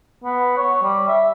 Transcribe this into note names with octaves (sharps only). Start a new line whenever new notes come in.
B3
C#5
G3
E5